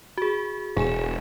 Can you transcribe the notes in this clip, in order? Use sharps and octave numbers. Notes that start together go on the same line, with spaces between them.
F#4 G#4
E1 G#4 G#5 E7